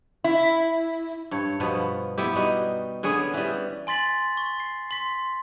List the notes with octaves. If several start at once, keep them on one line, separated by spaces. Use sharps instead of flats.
E4
G2 C#5
G2 B2 F3 B3
B3 E4 G4
G3 D#4 F#4
D3 B3 C#4 G#4
E3 G3
G#5 C6 A6 B6 F#7
C#6
C7
C6 B6